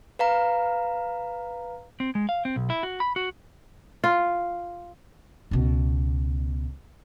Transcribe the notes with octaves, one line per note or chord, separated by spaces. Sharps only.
B4 F5 A#5
C4
G#3
F5
C4
B1
E4
F#4
B5
F#4
F4
C#2 B2